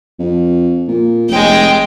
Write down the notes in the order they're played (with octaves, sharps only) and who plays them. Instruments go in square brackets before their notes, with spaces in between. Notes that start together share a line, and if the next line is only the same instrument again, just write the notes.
[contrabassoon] F2
A#2
[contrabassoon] F1 [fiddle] G#3 G5